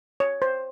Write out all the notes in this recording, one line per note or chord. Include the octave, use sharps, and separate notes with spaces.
C#5
C5